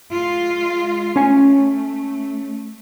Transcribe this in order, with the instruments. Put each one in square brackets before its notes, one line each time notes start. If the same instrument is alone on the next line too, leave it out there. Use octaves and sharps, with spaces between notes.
[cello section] G#3 F4
[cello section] A3 [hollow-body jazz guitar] C#4 G#5